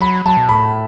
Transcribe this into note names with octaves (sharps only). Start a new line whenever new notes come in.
F#3 B5
F#3 A5
B2
A2 B5